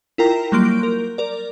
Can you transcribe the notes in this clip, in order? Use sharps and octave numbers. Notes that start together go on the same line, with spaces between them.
E4 F4 A#4 G5 A#5
F#3 G3 A#3 C6 G6 D7
A#4
A#4 D5